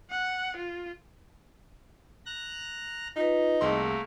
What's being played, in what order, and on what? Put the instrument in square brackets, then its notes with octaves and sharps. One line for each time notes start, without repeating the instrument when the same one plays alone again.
[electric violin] F#5
F4
[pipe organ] A#5 F#6 A#6
[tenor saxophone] D#4 [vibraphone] F4 B4
[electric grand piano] C2 C6 [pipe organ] A3 A#3 [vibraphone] G#4